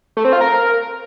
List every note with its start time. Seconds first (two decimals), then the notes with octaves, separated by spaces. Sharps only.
0.17 A3
0.25 C4
0.33 F4
0.41 A#4